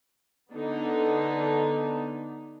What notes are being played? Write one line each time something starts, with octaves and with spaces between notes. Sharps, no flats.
D3 B3 D4 D#4